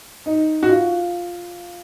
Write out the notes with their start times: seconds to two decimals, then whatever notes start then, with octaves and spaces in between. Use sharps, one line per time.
0.26 D#4
0.63 F#4
0.69 F4